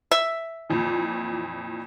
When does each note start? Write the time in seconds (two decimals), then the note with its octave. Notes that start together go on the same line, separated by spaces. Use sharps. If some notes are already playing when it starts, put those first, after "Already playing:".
0.11 E5
0.69 F2 A#2 E3